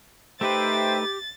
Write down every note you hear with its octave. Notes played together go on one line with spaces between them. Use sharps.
A3 D#4 G4 B4 C5 E5 G5 A6